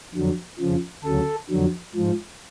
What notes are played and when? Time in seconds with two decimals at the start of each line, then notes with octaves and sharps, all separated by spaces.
0.14 F2 D3 F#3
0.59 F2 C#3 F3
1.04 D2 C#3 F#3 A4
1.50 F2 D3 F#3
1.95 G#2 F3